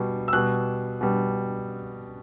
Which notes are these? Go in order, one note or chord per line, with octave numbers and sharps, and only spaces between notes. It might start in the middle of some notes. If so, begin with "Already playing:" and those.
Already playing: B2 G3
E6
B2 G3 F#6
B2 G3